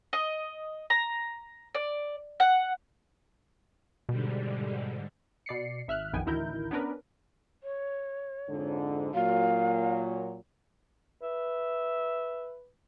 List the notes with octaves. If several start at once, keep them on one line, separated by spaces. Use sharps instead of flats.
D#5
A#5
D5
F#5
G#2 B2 D3 G3
B2 D5 C7 C#7
G#1 E5 F6 F#6
A#1 F2 D#3 B3 G5 G#5
A1 D2 D#3 E4 A#4 G6
B3 C#4 D4 A#4 B4
C#5
F2 G#2 D3
A#2 F#3 F5
B4 E5